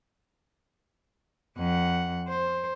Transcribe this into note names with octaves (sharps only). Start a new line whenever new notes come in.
F2 F#5
C5